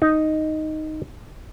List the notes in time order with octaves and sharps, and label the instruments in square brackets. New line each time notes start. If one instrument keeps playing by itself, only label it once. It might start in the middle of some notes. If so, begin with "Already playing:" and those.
[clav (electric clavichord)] D#4